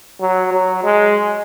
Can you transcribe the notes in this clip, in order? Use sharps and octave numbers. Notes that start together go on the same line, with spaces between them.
F#3
F#3
G#3